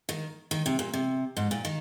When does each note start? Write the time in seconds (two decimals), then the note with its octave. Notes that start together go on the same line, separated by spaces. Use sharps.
0.09 D#3
0.51 D#3
0.66 C3
0.79 A#2
0.94 C3
1.37 G#2
1.51 A#2
1.65 D#3